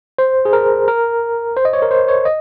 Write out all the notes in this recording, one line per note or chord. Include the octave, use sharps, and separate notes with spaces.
C5
G#4
A#4
A#4
C5
D#5
C#5
A#4
C5
C#5
D#5